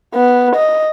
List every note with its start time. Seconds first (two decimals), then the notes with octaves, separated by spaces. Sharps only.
0.15 B3
0.56 D#5